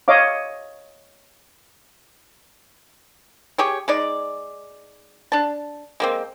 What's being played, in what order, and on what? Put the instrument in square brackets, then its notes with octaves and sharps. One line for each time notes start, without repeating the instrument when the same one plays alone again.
[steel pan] C#5 D#5 F5 D6
[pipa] G4 G#4 C#5
G#3 D#4 D5
D4 A5
G#3 A#3 C4